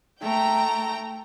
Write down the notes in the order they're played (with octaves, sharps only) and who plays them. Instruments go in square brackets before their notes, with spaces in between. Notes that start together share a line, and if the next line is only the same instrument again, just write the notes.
[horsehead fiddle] A3 [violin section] G5 A#5